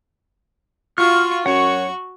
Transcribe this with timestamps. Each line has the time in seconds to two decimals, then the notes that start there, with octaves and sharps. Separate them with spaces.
0.98 F4 F#4 C#6 F6
1.46 F#2 F#4 C#5 F#5 C#6